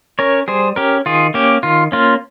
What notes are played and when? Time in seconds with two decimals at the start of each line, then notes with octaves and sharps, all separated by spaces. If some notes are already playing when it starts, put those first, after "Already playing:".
0.19 C#4 A#4 C#5
0.48 G3 G#4 C5
0.76 C#4 G4 A#4
1.06 D#3 F4 G#4
1.34 A#3 C#4 G4
1.63 D#3 F4
1.92 A#3 C#4 F4